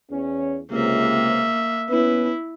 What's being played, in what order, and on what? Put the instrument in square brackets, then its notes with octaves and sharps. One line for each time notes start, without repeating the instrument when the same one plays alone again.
[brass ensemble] E2 C#4
[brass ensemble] C#2 C3 [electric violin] A#3 E5
[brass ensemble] B3 C#4 B4 [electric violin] E4